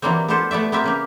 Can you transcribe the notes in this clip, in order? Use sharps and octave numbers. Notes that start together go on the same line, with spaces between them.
E3 F#3 G3 A#3 C4
B3 D4 F4 G4 A4 C5
A3 B3 D5 E5
B3 C4 G4 A#4 E5
C#3 A#3 G4